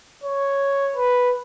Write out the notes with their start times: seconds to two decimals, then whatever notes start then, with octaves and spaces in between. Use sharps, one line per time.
0.24 C#5
0.96 B4